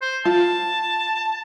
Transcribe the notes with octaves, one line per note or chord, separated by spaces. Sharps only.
C5
F4 A5